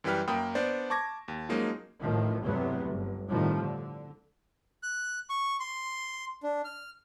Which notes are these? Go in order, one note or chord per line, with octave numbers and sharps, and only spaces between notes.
F#2 E3 G3 B4 G5 F6
F#2 A#3 G5 A#5 B5 D#6
B3 D4 C5 D5
A5 C#6 D6 G#6 A#6
D#2
F3 F#3 G#3 A#3 C#4 D#4
A1 A2 D#3 F3
E2 G2 C3 F#3 A3 B3
G1
A2 C3 D#3 F3 G3
D3
F#6
C#6
C6
D4
F6